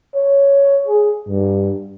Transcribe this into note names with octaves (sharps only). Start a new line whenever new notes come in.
C#5
G#4
G2